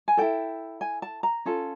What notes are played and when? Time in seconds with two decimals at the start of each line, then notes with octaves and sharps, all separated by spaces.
0.08 G#5
0.17 E4 A4 G5
0.81 G#5
1.02 A5
1.23 A#5
1.45 C#4 F4 A4